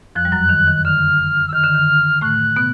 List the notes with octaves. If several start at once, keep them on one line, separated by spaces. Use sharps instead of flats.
F2 F3 F#6
G3
F#2 F#3
D#3
D#3
D3 F6
E6
D#3 F6
D3
D#3
A2 A3 F#6
B2 B3